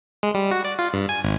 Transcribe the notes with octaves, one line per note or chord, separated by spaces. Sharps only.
G#3
G3
F#4
D5
F4
G2
G#5
G#1